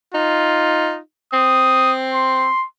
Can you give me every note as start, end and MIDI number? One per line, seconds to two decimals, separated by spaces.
0.14 0.98 63
0.14 1.00 65
1.33 2.48 60
1.33 1.93 87
2.14 2.66 84